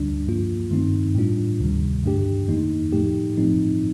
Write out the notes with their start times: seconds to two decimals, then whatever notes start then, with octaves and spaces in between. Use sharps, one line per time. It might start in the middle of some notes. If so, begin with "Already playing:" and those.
Already playing: D2 D3 G3 D4
0.27 G2 F3 A#3 F4
0.71 G2 D#3 A3 C4 D#4
1.15 A2 G3 D4 F4
1.60 D2 C3 D#3 G3
2.04 G2 D3 A3 D4 G4
2.48 F2 D#3 A#3 D#4
2.92 A2 F3 A3 D#4 G4
3.37 A2 F3 C4 D#4